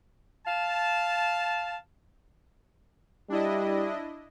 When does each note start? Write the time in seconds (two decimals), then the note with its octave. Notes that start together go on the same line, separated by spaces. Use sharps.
0.47 F5 A5
3.30 G3 D4 E4 D#5